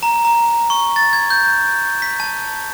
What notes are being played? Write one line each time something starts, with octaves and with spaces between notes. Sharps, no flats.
A#5
A#5
C#6
A6
G#6
G6
B6
A5